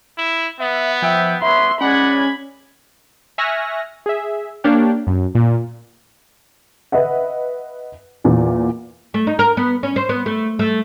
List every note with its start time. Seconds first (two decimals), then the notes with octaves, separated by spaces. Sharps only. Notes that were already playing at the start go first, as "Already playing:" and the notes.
0.18 E4
0.60 B3 E5
1.02 F3 E5 G5
1.42 B3 C#5 E5 B5 C6
1.81 G#3 C#4 D5 F#5 B5 G#6
3.38 E5 G#5 C#6 F6 F#6 A#6
4.06 G#4 E5
4.64 A#3 D4 G4 C#5 F5 G5
5.07 F#2
5.35 A#2
6.92 B4 D#5 E5 F#5
8.24 E2 A#2
9.14 A3
9.27 D#4
9.39 A#4
9.57 B3
9.83 C#4
9.96 C5
10.09 B3
10.26 A3
10.59 A3